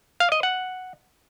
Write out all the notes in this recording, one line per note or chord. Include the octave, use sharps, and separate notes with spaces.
F5
D#5
F#5